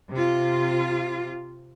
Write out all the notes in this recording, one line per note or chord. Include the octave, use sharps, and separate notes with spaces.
C3 F4